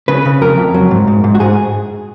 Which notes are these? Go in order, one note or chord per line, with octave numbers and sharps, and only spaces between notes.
C#3 B4
C#3
F2 A#4
F2
F#3
G#2
G#2
G#2
F#4
G#2 G#4